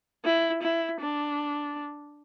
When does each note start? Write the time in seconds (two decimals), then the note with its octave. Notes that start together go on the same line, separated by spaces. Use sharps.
0.25 E4
0.63 E4
1.00 D4